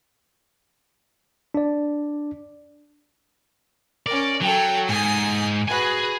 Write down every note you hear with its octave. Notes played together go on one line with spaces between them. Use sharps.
D4 D5
C#4 A#4 D5
F#3 A4 G5
G#2 G#5 D#6
F#4 G#4 B4 G#5